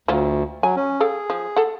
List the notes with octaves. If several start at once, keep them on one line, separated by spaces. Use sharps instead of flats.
D2 F#3 F4 C5
F#3 G#5
C#4
G#4 A4 F5 G5
F3
A4 F#5